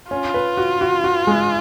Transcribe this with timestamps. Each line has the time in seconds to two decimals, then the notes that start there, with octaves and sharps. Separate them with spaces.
0.11 C#4 F4
0.34 B4
0.57 F#4
0.81 F#4
1.04 F#4
1.27 G#3